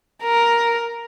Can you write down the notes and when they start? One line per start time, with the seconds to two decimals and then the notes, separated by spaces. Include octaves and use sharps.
0.23 A#4